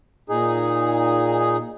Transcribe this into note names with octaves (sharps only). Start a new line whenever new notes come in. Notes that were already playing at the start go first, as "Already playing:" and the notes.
A#2 D#4 G#4